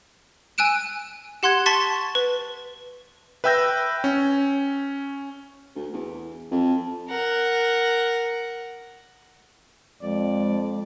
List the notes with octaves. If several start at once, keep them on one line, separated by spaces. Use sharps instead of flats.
G#5 E6 F#6 D7 E7
G4 F#5 C6 F#6 G#6
A5 C6 C#6 A6 B6
B4
B4 E5 G5 E6 G6 A#6
C#4
D2
E2
F2
A#4 F#5
F2 G#3 D5